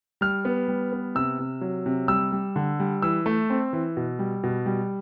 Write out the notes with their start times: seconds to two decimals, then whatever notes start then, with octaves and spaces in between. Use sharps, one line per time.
0.21 G3 F6
0.45 B3
0.68 G3
0.92 B3
1.15 C3 E6
1.39 C3
1.61 F#3
1.86 C3
2.08 G3 E6
2.32 G3
2.56 D3
2.80 G3
3.02 E3 E6
3.26 A3
3.50 C4
3.73 E3
3.97 B2
4.19 G3
4.43 B2
4.66 G3